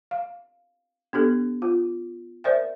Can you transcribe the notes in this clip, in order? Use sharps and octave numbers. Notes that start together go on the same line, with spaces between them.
F5
B3 D4 G4 A4
F4
A#4 C5 D5 E5 G5